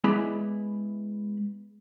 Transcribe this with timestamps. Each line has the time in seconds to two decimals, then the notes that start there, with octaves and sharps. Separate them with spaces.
0.04 G#3 B3 E4 D5 B5